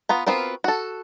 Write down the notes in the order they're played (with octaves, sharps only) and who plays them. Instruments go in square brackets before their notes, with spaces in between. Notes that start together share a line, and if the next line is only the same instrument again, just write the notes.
[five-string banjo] B3 F4 A#5
B3 C4 F4 F#4 A#4
F#4 A4